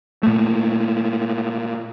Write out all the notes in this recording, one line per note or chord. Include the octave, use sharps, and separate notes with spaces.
A#2 A3